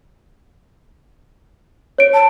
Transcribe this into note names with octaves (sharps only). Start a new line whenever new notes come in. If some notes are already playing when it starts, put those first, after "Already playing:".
C#5 D7
A5